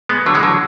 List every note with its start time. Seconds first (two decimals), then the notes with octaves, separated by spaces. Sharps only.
0.09 G#3 B3
0.26 D3 F#3
0.34 E3 G#3
0.43 D3 F#3